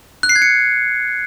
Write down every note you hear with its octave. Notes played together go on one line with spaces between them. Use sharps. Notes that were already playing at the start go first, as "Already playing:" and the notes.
F#6
C7
G#6
C#7